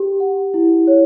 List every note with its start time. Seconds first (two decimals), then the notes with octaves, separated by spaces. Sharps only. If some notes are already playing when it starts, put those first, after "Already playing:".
Already playing: G4
0.20 F#5
0.54 E4
0.87 C#5